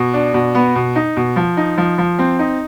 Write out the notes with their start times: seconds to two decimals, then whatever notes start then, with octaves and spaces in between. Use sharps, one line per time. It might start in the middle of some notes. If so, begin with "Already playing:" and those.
Already playing: B2
0.14 D4
0.34 B2
0.55 B3
0.75 B2
0.96 D#4
1.17 B2
1.36 F3
1.57 D#4
1.78 F3
1.98 F3
2.19 C4
2.39 D#4